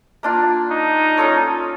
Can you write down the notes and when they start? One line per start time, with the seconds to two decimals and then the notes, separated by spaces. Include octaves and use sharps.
0.23 A#3 D4 F4
0.71 D#4
1.17 C#4 F4 A4 C#5